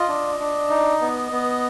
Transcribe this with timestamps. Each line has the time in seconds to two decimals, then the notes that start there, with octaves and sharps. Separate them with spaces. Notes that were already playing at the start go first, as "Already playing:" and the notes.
Already playing: F4 D#5
0.08 D4
0.40 D4
0.70 D#4
1.01 B3
1.32 B3